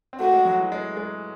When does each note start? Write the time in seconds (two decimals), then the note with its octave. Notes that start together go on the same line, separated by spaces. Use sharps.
0.13 C4
0.20 A3 F#4
0.33 G#3
0.45 F#3
0.59 E3
0.72 G#3
0.97 G#3